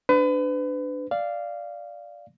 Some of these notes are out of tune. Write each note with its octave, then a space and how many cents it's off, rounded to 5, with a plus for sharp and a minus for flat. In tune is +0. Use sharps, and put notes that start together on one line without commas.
D4 +0 B4 +35
D5 +0 F5 -10